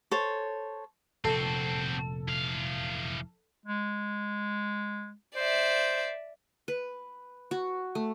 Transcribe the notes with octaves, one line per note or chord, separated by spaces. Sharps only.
A4 C5 C#5
F1 A#2 C4 F#4 A4
E3 F5
G#3
C5 D5 E5
B4
F#4
A3